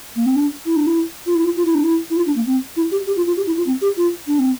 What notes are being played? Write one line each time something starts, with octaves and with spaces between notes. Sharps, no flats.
A#3
C4
D4
E4
D4
E4
F4
E4
F4
F4
E4
D4
E4
E4
F4
D4
A#3
C4
E4
G4
G4
F4
F4
G4
E4
F4
C4
G4
F4
D4
C4